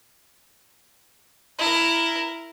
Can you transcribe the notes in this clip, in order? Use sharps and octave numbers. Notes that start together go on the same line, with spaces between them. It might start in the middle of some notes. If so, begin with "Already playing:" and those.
E4 A#4